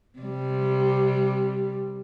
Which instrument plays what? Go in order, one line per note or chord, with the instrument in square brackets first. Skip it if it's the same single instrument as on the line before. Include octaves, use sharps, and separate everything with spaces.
[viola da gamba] C3 G3